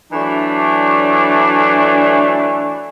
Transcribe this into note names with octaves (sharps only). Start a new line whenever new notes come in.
E3 F#3 A3 D4